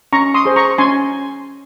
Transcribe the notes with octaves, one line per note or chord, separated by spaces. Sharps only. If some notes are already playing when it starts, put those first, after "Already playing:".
C#4 A#5 C#6
C6 D#6
G#4 C5
A#5 C#6
C#4 G#5 C6